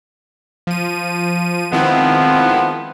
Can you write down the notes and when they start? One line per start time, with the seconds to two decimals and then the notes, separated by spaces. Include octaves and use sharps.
0.67 F3 D#7
1.73 D#3 F3 G#3 B3 C4 E4